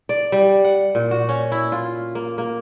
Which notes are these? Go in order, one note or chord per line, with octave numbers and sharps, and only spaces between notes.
D5
G3
F#5
A#2
F#4
C#4
E4
F4
A#3
A#3